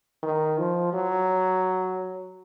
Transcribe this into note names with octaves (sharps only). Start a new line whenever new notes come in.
D#3
F3
F#3